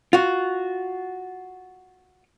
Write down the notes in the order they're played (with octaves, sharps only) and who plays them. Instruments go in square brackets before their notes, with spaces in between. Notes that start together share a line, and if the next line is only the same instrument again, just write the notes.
[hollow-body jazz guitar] F4 F#4